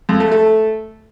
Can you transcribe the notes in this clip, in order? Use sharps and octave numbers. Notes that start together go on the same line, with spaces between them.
F2
A3
A3